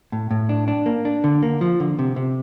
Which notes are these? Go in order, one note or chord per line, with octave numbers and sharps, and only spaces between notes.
A2
A2
D4
D4
A#3
D4
D3
A#3
F3
D3
C3
C3